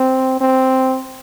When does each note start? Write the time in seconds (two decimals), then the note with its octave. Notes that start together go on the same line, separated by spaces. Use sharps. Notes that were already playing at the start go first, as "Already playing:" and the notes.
Already playing: C4
0.41 C4